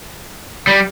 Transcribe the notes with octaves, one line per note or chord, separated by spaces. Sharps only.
G3